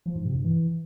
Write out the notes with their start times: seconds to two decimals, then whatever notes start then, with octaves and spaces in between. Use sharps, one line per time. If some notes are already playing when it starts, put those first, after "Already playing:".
0.06 F3
0.15 G#2
0.25 C3
0.35 G2
0.44 E3